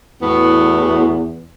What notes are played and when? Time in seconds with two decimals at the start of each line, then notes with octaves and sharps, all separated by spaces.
0.22 E2 A2 B3 F#4